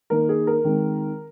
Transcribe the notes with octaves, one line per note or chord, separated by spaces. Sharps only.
D#3 A#3 D#4 A#4
G#4
A#4
D#3 G#3 C4